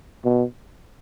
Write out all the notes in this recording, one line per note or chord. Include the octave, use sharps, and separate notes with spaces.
B2